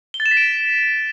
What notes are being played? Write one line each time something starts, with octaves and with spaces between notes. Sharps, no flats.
G7
A6
E7
B6
D7